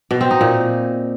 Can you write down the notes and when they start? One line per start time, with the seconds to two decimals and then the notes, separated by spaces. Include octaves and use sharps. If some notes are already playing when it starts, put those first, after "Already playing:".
0.11 B2
0.21 C4
0.31 D#4
0.41 A#2